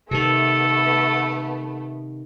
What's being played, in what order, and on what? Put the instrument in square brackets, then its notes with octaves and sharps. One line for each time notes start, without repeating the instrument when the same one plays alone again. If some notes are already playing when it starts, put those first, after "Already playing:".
[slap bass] C3 D#3 [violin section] A3 B3 [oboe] A4